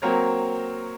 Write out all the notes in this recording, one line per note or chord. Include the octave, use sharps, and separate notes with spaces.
F#3 A#3 C4 A#4 C#5